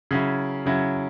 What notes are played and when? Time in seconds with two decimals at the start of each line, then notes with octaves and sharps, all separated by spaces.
0.11 C#3 F#3 C#4 E4
0.66 C#3 F#3 C#4 E4